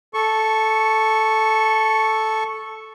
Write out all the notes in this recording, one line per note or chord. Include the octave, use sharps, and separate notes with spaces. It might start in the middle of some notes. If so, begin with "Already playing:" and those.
A4 C#6